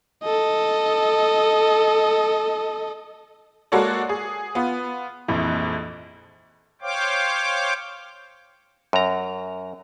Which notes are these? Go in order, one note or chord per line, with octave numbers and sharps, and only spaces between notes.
A4 D#5
G#3 A#3 F#4 A4 C#5 D5
G#4
B3 F4
A#1 F2 E3
C5 C#5 F5 G5 D6
F#2 A#5